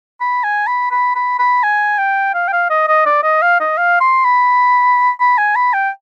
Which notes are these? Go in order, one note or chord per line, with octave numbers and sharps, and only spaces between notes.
B5
G#5
B5
B5
B5
B5
G#5
G5
F5
G5
F5
D#5
D#5
D5
D#5
F5
D#5
F5
C6
B5
B5
G#5
B5
G5